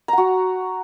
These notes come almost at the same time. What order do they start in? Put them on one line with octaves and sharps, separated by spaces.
A#5 F#5 F#4